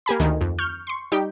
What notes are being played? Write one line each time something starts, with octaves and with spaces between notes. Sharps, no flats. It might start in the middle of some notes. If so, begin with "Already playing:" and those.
A#3 G4 G#5 B5
D2 D#3
F2
C#6 F6 G6
C6 C#6
G3 D#4 G4 G5